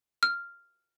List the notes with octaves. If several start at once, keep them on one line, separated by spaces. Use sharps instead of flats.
F6